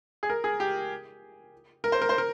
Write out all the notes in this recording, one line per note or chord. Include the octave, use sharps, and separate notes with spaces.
G#4
A#4
G#4
G4
A#4
C5
A#4
C5
A#4